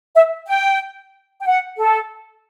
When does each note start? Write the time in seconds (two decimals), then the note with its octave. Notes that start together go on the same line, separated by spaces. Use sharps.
0.15 E5
0.48 G5
1.41 G5
1.46 F#5
1.78 A4